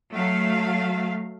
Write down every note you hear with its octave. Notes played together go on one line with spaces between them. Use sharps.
F#3 A3 F5